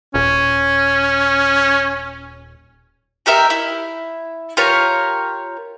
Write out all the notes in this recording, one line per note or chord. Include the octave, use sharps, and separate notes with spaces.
D#1 C#4
D#4 G4 A#4 E5
E4
F4 G4 A#4 C#5